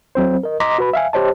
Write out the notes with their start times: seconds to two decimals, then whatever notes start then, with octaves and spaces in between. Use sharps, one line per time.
0.15 F#3 C4 C5
0.43 A#4 D#5
0.60 D#5 A#5 C6 D6 A#6 B6
0.78 F#4 B4 B5
0.93 E5 F5 G#5
1.13 G4 C5 C#5 D#5 A5